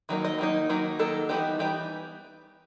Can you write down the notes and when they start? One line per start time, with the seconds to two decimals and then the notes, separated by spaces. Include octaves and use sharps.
0.09 D#3 F#3 A#3 D#4
0.25 D#5
0.38 D#3 F#3 A#3 D#4
0.69 D#3 F#3 A#3 D#4
0.99 D#3 F#3 A#3 D#4 A4
1.29 E3 G3 B3 D#4 G4
1.59 E3 G3 B3 D#4 G4